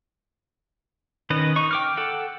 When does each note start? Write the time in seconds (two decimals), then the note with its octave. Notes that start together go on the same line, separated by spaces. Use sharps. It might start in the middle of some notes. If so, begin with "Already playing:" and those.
1.30 D#3 C#4 B4 D#5
1.56 D#4 C#6
1.71 G5 D6 F6
1.97 A4 F#5 G5